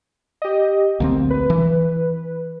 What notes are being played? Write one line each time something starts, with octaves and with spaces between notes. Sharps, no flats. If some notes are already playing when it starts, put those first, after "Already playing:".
G4 D#5
D2 G#3 A#3 C4
A#1
B4
E3